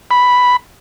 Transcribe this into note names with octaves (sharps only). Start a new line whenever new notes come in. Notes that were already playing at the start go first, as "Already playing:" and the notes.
B5